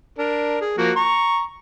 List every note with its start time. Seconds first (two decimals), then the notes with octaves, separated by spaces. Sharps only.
0.18 D4 A#4
0.61 G#4
0.78 F3 A#3 F#4
0.96 A#5 C#6